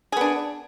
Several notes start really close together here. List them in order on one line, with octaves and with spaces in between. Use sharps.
G#4 B3 D4